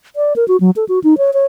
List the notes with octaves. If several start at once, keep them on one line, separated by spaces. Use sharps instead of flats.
D5
A#4
F#4
F#3
A4
F#4
D#4
C#5
C#5